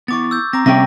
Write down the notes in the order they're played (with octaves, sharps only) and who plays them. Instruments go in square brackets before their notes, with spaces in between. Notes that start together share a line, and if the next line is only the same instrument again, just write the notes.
[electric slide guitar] B3 E4 [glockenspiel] C#6 D6 A6
[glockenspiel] E6 G6
[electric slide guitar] C4 [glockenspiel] A#5 D6 A#6
[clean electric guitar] C3 C#4 G5 [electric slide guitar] G3 B3 E5 [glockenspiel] A#6